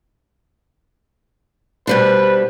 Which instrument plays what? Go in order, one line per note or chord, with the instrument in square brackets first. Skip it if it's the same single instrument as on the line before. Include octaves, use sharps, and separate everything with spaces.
[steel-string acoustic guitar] B2 G3 D4 [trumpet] B4 [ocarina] C5